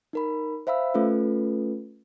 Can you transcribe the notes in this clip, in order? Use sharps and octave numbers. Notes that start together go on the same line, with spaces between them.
D#4 A#4 B5
C5 E5 F5 B5 E6
A3 C#4 F4 A4 B4